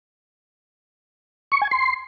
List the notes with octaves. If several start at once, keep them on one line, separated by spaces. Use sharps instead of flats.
C#6
G#5
C6